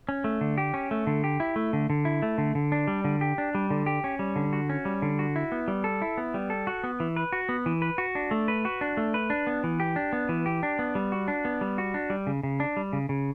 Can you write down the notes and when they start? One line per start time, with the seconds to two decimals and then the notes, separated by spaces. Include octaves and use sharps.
0.09 C#4
0.24 A3
0.41 D3
0.58 G4
0.74 C#4
0.91 A3
1.07 D3
1.24 G4
1.40 E4
1.56 A3
1.73 D3
1.90 D3
2.05 E4
2.22 A3
2.38 D3
2.55 D3
2.72 D4
2.88 G3
3.04 D3
3.21 G4
3.38 D4
3.55 G3
3.70 D3
3.86 G4
4.04 C#4
4.19 G3
4.36 D3
4.53 F#4
4.69 C#4
4.85 G3
5.02 D3
5.19 F#4
5.36 E4
5.52 B3
5.68 G3
5.84 A4
6.02 E4
6.18 B3
6.34 G3
6.50 A4
6.67 F#4
6.84 B3
7.00 E3
7.16 B4
7.32 F#4
7.49 B3
7.66 E3
7.82 B4
7.98 F#4
8.15 D4
8.31 A3
8.48 B4
8.65 F#4
8.81 D4
8.97 A3
9.14 B4
9.30 D4
9.47 B3
9.64 E3
9.80 G4
9.96 D4
10.13 B3
10.29 E3
10.46 G4
10.63 D4
10.79 B3
10.95 G3
11.12 F#4
11.28 D4
11.45 B3
11.61 G3
11.78 F#4
11.94 D4
12.10 G3
12.27 C#3
12.43 C#3
12.60 D4
12.77 G3
12.93 C#3
13.09 C#3